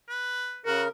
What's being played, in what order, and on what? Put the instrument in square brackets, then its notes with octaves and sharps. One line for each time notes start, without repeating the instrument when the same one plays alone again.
[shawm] B4
[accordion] C#3 A#4 [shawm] F#4